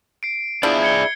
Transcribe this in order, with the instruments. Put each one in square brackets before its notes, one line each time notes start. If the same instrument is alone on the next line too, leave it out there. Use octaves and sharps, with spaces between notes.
[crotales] C7 D7
[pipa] F3 D4 E4 [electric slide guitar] G#4 D5
[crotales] G#6 C#7 G7